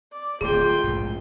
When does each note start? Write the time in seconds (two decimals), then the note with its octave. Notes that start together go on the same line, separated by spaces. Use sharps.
0.12 D5
0.41 D1 A3 F4 G#4 G5
0.83 A#1 G#2